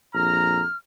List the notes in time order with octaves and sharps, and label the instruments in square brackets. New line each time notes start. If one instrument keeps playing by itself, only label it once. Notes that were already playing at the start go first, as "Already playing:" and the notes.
[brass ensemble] A#1 F2 A#5 [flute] F6